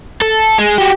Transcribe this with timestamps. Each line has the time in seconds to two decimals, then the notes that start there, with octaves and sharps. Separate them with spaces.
0.21 A4
0.59 G#3
0.78 F#4 G4